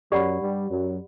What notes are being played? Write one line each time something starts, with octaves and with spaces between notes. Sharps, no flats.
F#2 F#3 G4 D5 F#5 B5
G2 G3
F#2 F#3